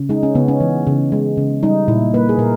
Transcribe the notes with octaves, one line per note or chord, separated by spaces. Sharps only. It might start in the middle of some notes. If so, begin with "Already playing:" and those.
Already playing: C#3
G#3 D#4
C#4
C#3 B3
C#4
E3
C#3
G#3
C#3
G3 D#4
A#2 E4
A#3 B4
G#4
A#2 A#4